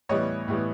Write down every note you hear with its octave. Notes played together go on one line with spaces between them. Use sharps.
A2 E3 G3 B3 C#5 D#5
A2 E3 G3 B3